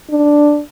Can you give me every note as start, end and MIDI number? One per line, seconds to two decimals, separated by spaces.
0.10 0.61 62